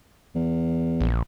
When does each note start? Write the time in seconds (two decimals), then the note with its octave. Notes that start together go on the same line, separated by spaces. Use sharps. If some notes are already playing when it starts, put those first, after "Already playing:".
0.35 E2
1.01 A#1